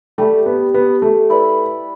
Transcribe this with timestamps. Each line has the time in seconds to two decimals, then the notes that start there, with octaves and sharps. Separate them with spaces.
0.18 G3 A3 D4 G4
0.46 B3
0.74 B3
1.02 A3
1.30 E4 B4 D5